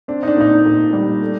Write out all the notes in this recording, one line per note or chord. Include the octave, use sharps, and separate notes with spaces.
C4 D4
D#4
D4
A#2 D#4
D4
A#2
G3
A3